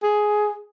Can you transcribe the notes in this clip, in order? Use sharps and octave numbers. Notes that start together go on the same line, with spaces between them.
G#4